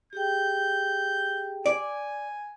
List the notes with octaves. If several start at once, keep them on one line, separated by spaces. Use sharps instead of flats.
G4 G#4 G5 G6
D5 G#5